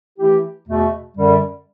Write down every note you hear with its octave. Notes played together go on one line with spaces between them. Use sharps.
E3 A3 E4 G4
E2 B2 A3
F#2 D3 G3